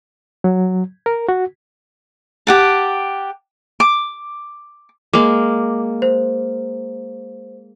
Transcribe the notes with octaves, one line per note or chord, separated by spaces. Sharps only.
F#3
A#4
F#4
G4 F#5 A5
D6
G#3 A#3 D6
C5